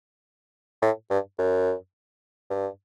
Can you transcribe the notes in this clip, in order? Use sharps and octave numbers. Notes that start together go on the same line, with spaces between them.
A2
G2
F#2
G2